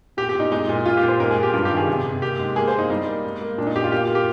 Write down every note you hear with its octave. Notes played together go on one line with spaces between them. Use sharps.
A#2 G4
G4
A#2 D#4
G#3 D#4
A#2
A#2 F4
G4
A#2
C5
G#2 A#4
G#4
G#2
G4
G2 F4
G4
D#3
G#4
C3
C3
A#3 G4
G#2
A#3 G#4
C5
A#3
D#4
G3 D#4
A#3
G#2
A#3
A#2 D4
D#4
A#2 G4
F4
A#3 G4
F4
A#3
G4